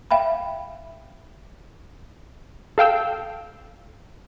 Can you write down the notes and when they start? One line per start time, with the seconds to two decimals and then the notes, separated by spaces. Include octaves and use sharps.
0.11 E5 F5 G5 B5
2.78 A4 F5 G5 E6